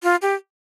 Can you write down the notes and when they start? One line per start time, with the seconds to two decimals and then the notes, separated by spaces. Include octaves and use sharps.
0.03 F4
0.22 G4